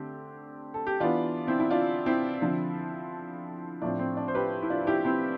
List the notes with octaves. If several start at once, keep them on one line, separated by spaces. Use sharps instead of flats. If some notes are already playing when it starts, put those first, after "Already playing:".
Already playing: D3 A3 C4 G4
A4
G4
E3 B3 D4 F4
C4 E4
E4
D4 F4
C4 E4
D3 F3 C4
A2 F3 C4 D4
C4
D4
C5
G4 B4
E4
D4 F4
F4
E4 G4
C4 E4